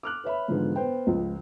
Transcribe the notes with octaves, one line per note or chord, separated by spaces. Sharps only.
D6 F6 F#6
B4 C#5 E5 B5
G#2 D3 E3 F3 B3 G#4
B3 C5 G5
C#2 F3